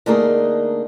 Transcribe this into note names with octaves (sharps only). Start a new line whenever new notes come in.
D3 A3 A#3 D#4 G#4